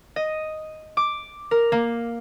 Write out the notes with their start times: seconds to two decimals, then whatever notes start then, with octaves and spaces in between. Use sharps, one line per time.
0.16 D#5
0.97 D6
1.51 A#4
1.72 A#3